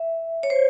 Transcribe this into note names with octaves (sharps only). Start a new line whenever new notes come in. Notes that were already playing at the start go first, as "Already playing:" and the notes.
Already playing: E5
C#5
C5